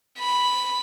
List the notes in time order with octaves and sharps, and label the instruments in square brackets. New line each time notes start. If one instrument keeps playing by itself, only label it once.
[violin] B5